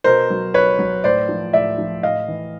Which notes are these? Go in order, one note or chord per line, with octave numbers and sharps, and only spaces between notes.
B2 A#4 C5
F#3
B2 B4 C#5
F#3
A2 C5 D5
F3
A2 D5 E5
F3
A2 D#5 F5
E3